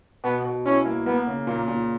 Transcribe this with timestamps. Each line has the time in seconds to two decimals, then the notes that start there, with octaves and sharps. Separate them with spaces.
0.24 B2 B3
0.45 B2
0.66 C#4 E4
0.86 A#3
1.06 A#3 B3
1.27 C#3
1.47 A#2 A#3
1.68 A#2